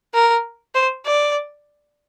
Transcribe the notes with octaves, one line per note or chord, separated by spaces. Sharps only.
A#4
C5
D5